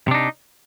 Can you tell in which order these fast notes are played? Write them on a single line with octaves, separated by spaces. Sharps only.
C3 D4 D#4